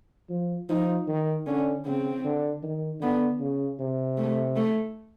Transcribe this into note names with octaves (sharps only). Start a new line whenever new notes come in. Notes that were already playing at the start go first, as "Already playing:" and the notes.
F3
F3 D#4
D#3
D3 C#4
C#3 C4
D3
D#3
D3 B3
C#3
C3
A3
A3